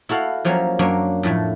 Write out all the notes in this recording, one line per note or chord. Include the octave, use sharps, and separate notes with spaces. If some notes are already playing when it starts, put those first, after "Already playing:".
E4 F#4 A4 F5
F3 F#3 A#3 C#4 C#5
F#2 A#3 D4 C#5
F2 A2 A3